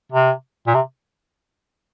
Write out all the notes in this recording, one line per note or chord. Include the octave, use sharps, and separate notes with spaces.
C3
A#2
C3